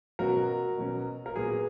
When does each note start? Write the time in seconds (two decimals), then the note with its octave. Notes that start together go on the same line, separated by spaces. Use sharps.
0.19 B2 F#3 C#4 F#4 A#4
0.77 B2 F#3 C#4
1.26 A#4
1.36 A#2 F#3 B3 G#4